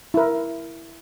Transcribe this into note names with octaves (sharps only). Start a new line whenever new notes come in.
E4 A#4